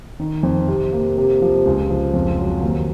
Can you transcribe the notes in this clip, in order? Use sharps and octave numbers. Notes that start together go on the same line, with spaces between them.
D#3
F2
C3
A#3
C3
F3
C#2
F3
F2
F#3
D#2